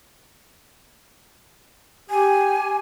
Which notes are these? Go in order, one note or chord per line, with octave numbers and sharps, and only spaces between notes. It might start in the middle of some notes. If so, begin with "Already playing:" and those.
G4 G#5